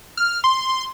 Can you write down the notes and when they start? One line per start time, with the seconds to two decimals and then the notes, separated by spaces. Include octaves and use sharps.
0.17 F6
0.44 C6